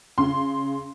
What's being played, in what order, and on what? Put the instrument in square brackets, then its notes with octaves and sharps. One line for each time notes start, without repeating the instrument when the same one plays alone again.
[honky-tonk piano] C#3 C6